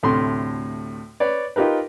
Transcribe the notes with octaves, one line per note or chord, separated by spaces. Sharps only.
D2 A2 C3 C6
B4 C#5 D5
D#4 F4 G4 A#4 B4